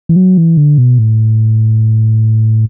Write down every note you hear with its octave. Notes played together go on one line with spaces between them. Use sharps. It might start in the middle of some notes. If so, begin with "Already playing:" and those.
E3
F#3
E3
D3
B2
A2